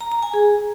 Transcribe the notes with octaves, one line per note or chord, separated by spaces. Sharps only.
A#5
A#5
G#5
G#4